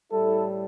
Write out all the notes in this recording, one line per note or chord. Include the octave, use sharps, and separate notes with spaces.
A2 G3 E4 A4